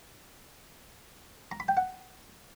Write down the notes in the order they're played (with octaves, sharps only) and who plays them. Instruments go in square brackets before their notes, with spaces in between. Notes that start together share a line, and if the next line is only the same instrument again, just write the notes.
[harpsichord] A#5
B5
G5
F#5